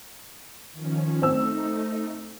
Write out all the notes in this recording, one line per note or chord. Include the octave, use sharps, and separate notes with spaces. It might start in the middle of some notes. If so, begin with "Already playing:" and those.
D#3 F3 C#4
A3 C4 D#4 E6